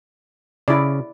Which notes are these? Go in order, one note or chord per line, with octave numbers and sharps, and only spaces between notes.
C#3 E4 D5